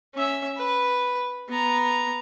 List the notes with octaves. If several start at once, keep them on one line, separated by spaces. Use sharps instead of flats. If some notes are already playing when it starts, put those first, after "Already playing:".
C#4 E5
B4
B3 A#5